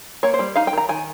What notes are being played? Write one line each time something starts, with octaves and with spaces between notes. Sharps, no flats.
A#3 C#5
C5
G3
D#4 F5
G5
D#3 A#5
D#3 G#5